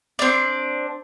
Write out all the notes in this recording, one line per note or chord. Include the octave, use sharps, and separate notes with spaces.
C4 D4